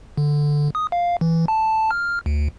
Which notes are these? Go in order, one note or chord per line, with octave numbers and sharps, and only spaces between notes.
D3
D#6
F5
E3
A5
F6
D2